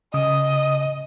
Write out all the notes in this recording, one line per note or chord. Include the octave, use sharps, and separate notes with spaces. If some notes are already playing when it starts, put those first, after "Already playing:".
C#3 D#5 D#6